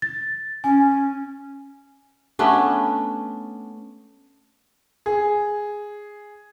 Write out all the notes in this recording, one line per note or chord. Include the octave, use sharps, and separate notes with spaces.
A6
C#4 G#5
A3 B3 C#4 D4
G#4